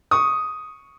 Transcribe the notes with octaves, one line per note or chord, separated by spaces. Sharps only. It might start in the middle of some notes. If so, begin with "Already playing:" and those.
C#6 D#6